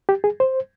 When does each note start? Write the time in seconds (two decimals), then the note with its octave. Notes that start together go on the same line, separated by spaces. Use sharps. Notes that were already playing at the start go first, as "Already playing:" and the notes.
0.09 G4
0.24 G#4
0.40 C5